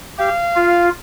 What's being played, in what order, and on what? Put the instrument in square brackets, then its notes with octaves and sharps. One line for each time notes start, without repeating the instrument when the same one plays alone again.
[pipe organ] G4 [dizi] F5
[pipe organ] F4